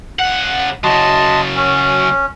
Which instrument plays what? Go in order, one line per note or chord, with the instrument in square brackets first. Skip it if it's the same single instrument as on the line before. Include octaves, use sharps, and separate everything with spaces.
[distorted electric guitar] C#3 F#5
[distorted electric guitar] C#3 F#3 [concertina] D#5 A5 C6
[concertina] C#4